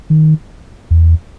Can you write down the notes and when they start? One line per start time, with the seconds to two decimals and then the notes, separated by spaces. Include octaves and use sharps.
0.10 D#3
0.91 E2